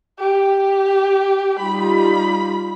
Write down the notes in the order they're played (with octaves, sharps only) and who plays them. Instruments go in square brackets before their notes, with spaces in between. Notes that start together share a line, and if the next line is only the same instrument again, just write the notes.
[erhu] G4
[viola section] G3 D#4 F4 [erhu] B5